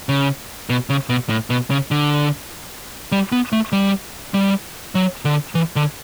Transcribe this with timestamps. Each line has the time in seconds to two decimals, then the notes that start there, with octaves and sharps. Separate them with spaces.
0.09 C#3
0.70 B2
0.90 C#3
1.09 B2
1.29 A2
1.50 B2
1.70 C#3
1.91 D3
3.12 G3
3.32 B3
3.52 A3
3.72 G3
4.34 G3
4.95 F#3
5.25 D3
5.55 E3
5.76 D3